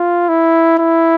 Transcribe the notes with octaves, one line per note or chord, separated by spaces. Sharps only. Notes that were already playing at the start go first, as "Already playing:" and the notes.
Already playing: F4
E4
E4